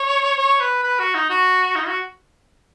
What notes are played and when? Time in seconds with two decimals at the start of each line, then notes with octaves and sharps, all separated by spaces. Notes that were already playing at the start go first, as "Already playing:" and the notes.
Already playing: C#5
0.38 C#5
0.61 B4
0.84 B4
0.99 F#4
1.14 D#4
1.30 F#4
1.75 D#4
1.87 F#4